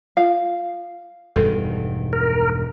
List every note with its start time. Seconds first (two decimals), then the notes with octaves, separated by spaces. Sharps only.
0.17 F4 F5
1.36 E1 G2 D#3 A4
2.13 A#4